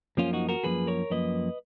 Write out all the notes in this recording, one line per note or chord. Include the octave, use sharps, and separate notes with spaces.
F#2 F3 A#3 C#4 F4
D#4 F#4
F#4 A#4
F#2 F3 A#3 G#4 B4
A#4 C#5
F#2 F3 A#3 B4 D#5